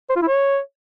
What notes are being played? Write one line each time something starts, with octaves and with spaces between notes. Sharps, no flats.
C5
F4
E4
C#5